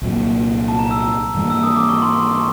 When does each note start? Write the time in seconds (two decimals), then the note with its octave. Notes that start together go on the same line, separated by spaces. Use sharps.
0.02 C2 A#2 F#3 A#3
0.68 A5
0.79 A#5
0.91 E6
1.35 G#2 E3 G3 A#3
1.50 E6
1.63 D#6
1.76 D6
1.89 C#6
2.02 C6
2.35 C#6